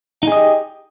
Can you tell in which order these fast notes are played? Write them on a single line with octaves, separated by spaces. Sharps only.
D#4 G#4 D#5 G4